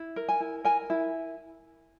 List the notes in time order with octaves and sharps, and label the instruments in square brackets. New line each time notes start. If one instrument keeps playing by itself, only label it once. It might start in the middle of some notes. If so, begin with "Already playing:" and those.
Already playing: [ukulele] E4
A#4
G#5
E4
A#4 G#5
E4